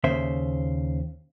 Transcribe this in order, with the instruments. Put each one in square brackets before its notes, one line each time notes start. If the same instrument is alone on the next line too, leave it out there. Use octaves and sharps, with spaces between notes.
[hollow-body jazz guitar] D#2 C#3 C5 E5